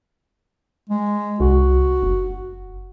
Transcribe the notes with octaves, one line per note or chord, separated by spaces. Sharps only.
G#3
C2 F#4
F#1